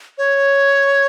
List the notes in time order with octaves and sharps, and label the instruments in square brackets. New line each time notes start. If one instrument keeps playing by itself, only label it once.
[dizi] C#5